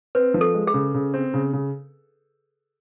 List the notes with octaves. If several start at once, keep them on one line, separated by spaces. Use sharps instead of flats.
C4 B4
F3
A4
G#3
G#4
C#3
C#3
C4
C#3
C#3